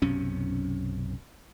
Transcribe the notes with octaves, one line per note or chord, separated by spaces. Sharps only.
B1 F#2 C3 C#4